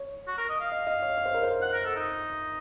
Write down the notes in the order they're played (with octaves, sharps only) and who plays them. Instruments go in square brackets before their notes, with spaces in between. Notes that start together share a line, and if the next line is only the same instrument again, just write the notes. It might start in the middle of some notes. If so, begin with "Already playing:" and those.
Already playing: [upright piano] C#5
[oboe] F#4
A#4
D#5
F5
[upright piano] D#5
D#5
C#5
C#5
C5
A#4
C5
[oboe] F#5
A#4
A4
D#4